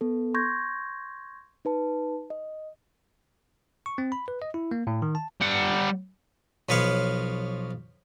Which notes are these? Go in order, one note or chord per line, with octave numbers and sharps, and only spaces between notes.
B3 A4
C6 C#6 G6 G#6 A#6
D#4 B4 A5
D#5
C#6
C4
B5
B4
D#5
E4
A#3
A2
D#3
A5
G3 F#5
B1 F3 B4 C#5 F5 C#6